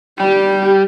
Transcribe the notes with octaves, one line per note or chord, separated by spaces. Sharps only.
G3 G4